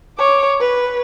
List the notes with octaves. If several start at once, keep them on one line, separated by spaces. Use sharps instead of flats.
C#5 D6
B4